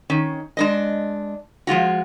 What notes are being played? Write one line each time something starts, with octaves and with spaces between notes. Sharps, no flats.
D#3 C#4
G#3 D4 D#5
F3 G#3 F4 F#4